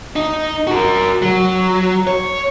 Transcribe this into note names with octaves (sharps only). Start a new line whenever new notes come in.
D#4
F#4 A#4
F#3
C#5